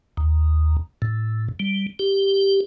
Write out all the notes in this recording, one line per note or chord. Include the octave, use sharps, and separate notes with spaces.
D#2
A2
G3
G4